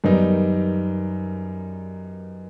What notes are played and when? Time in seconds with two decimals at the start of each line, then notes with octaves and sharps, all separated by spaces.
0.04 F#2 D#3 G3 B3 D#4